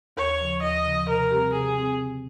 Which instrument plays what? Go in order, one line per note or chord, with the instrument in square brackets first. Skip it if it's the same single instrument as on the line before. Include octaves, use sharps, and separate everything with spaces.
[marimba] D#2 [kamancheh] C#5
[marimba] C#3 F3
[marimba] D#2 [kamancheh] D#5
[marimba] C#3 F3
[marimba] C3 [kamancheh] A#4
[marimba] G3 C4 G4
[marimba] C3 [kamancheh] G#4
[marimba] G3 C4 G4
C#3